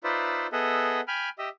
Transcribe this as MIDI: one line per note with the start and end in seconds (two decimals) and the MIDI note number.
0.04 0.47 63
0.04 0.47 65
0.04 0.47 71
0.04 0.47 72
0.04 0.47 74
0.04 0.47 76
0.52 1.01 59
0.52 1.01 68
0.52 1.01 69
0.52 1.01 75
0.52 1.01 76
0.52 1.01 78
1.08 1.29 79
1.08 1.29 80
1.08 1.29 83
1.08 1.29 89
1.39 1.49 67
1.39 1.49 75
1.39 1.49 76